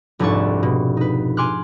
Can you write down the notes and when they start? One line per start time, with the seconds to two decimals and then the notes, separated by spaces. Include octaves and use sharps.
0.19 F1 C2 G#2 D4 A5 C#6
0.63 B2
0.97 D#4 B4
1.37 G#5 C6 D6 F6 F#6